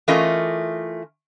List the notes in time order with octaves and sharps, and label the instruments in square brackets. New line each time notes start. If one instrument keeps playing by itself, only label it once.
[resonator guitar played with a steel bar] E3 A3 C#4 F4 A#4 D#5